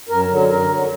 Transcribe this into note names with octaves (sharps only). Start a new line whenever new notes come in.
F#2 A#4
D3 F#3
F#2 A#4
D3 F#3